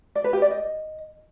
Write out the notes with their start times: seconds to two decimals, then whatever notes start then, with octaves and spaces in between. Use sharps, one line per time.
0.15 D5
0.24 B4
0.33 G4
0.42 D5
0.51 D#5